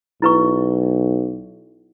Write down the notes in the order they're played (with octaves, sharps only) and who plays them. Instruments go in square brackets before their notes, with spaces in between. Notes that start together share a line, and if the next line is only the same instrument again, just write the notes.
[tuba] B1 [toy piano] E4 B4 C#6